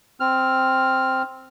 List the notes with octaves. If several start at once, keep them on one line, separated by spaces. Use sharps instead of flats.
C4 F6